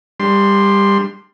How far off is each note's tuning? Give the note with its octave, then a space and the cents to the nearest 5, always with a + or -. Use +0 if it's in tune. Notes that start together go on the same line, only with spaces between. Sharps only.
G3 +20 D4 +25 C6 +0